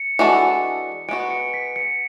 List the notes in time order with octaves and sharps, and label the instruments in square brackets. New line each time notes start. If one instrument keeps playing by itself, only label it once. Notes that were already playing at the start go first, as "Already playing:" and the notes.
Already playing: [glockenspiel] C#7
[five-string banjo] E3 G#3 D4 F#4 A4
[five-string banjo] G#3 B3 F#4 [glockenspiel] D7
[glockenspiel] C#7
B6
C#7